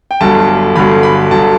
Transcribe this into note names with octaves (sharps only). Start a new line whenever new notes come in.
G5
G1 G2 D3 F#3 A5
G1 G2 D3 F#3 B5
B5
G2 D3 F#3 A5